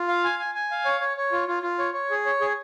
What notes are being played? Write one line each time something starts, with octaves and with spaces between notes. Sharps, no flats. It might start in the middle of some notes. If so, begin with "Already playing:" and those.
Already playing: F4
F5
G#5
G#5
G#5
F5
C#5
C#5
C#5
F4
F4
F4
C#5
C#5
G#4
C#5
G#4